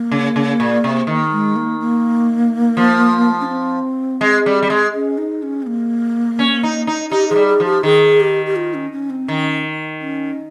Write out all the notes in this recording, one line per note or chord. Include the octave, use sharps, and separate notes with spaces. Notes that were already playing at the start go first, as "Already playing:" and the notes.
Already playing: A#3
C#3
C#3
A#2
C3
D#3
G#3
A#3
A#3
F3
C#4
C4
G#3
G3
G3
G#3
C#4
D#4
C#4
C4
A#3
C#4
D#4
D#4
D#4 G4
F3 G#4
G3
G#4
F3
G4
D#3 G#4
G4
G4
F4
C#4
C#4
C4
D#3 C#4
C#4